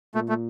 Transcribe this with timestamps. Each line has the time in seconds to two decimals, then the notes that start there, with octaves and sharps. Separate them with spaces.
0.14 A#2 A3
0.29 A3